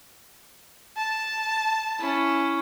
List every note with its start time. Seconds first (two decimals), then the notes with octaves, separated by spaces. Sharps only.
0.97 A5
1.99 C#4 E4